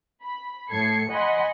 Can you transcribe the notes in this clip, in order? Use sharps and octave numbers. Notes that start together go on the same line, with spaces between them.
B5
A2 A4 G#6 C7 C#7
D#5 F#5 G#5 B5 C6